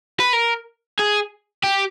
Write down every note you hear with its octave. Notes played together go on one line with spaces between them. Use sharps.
B4
A#4
G#4
G4